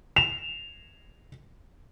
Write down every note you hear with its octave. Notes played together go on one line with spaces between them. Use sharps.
E7 F7